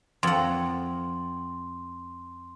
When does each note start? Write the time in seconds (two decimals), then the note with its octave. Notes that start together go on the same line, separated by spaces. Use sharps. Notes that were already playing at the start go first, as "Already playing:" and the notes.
0.23 F2 F#5 C6